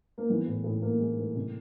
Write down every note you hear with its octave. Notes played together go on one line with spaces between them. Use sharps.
A#3
E3 B3
A2
A2
A2 A#3
G#3
A2
C3